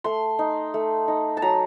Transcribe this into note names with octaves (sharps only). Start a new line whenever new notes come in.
A3 C6
D#4
A3
D#4
A5
F#3 A#5